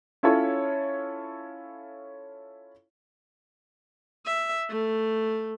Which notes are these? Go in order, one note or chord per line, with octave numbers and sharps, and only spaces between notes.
C#4 E4 F4 A4 C#5
E5
A3